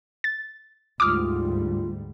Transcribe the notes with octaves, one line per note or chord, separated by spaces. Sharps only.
A6
D2 G#2 G3 F4 D6 D#6 F6